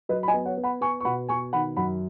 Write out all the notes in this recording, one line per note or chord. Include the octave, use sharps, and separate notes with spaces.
F#3 B4 D#5
B5
D#5 G#5
B3
C#5 F#5
B3
F#5 B5
B3 G#5 C#6
C#6
B2 F#5 B5
B2 G#5 C#6
D#3 F#5 B5
F#2 F#5 B5